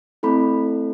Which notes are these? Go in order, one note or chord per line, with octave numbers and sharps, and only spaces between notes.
A3 C4 E4 A4 B5